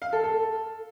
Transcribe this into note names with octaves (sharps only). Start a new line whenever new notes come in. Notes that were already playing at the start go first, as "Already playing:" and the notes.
F5
A4
A4